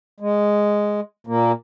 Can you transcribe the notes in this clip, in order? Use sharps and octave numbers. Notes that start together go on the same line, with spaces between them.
G#3
A#2 A#3